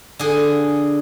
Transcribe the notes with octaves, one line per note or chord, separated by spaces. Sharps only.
D3 G#4